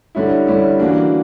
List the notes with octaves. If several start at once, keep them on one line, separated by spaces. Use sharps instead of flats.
D3 G3 C#4 E4
D3 G3 C#4 E4
E3 A#3 D4 F#4